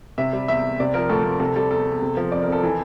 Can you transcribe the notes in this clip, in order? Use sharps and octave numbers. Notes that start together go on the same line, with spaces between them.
C3 E5
G3
E2 E5
E2
C3 D5
F3 A#4
D2 A4
D2
C3 A4
G3 A4
E2 A4
E2
C3
F3
F2 D5
A#4
F2 A4
E3